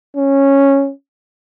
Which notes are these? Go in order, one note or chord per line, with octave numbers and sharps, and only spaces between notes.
C#4